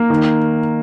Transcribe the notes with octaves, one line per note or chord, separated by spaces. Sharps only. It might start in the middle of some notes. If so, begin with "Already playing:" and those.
Already playing: A#3
D#3